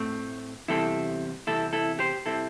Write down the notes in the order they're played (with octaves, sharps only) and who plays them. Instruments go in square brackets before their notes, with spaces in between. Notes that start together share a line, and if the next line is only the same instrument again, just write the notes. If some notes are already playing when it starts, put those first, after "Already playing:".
Already playing: [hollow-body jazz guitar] A2 A3 C4
E2 C3 G3 C4 E4 A4
E2 C3 G3 C4 E4 A4
E4 A4
G4 C5
C3 G3 C4 E4 A4